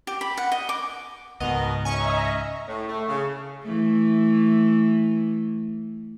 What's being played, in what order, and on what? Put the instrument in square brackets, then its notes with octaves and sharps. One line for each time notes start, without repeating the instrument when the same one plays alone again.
[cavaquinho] G4
B5
F#5
D#5
D6
[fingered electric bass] C#2 G#2 [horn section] B2 D#3 B3 [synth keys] D#5 A#5
[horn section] C#4 [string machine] D#5 E5 A#5 [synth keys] G#5 C#6
[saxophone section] A2
A3
C#3
[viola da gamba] E3 A3